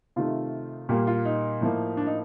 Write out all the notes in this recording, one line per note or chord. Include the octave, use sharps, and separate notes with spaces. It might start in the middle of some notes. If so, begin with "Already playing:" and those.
C3 D#3 A3 F4
A#2 G3 A#3 G4
F4
D#4
A2 F3 A#3
D4
D#4